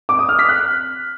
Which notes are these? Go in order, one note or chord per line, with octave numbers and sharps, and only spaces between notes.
D6
D#6
F6
B6
F#6